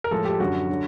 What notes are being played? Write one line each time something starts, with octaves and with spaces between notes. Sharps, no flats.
A#4
A2 F3 G#3 A4
G4
F#2 D3 F#3 F#4
D3 F#3